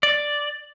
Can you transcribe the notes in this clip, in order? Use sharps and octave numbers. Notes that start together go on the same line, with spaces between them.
D5